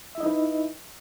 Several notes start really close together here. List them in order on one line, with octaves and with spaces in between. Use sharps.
E5 E4 D#5 D#4 B4